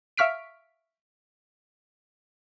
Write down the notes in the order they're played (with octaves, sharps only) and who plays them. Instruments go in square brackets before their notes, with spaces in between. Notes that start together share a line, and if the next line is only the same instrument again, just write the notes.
[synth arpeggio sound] E5 F5 C#6 F6 B6 D7